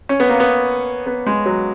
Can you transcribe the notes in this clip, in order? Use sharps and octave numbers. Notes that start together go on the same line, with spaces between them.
C#4
B3
A#3
B3
B3
G#3
F#3